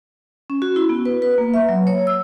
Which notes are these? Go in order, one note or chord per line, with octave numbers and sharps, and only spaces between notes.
C#4
F#4
E4
B3
B4
B4
A#3
E5
F#3
C#5
E6